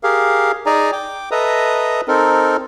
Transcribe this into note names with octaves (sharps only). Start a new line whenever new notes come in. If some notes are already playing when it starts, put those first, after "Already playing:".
G4 G#4 A#4 F5
D#4 G#4 D5 G#5 A#5
G5 D6
A4 B4 D#5 E5 A#5 D#6
C4 D#4 A4 A#4